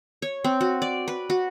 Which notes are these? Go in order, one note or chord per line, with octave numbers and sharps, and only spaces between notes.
C#5
C4
F#4
D5
B4
F#4